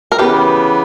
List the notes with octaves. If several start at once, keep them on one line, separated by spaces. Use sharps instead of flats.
A#4
C#3 E3 B3 G4 B4